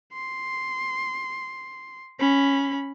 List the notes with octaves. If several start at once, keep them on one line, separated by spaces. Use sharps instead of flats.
C6
C#4 B5